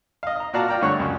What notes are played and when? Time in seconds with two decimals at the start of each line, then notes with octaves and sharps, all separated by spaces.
0.23 D#5 F5
0.36 D#5 A#5
0.53 A#2 F#4 D5 F5 A5 A#5
0.68 F4 D5 G5 A#5 F6
0.81 G2 D3 A3 C#5 C#6 F#6
0.99 C#2 F#2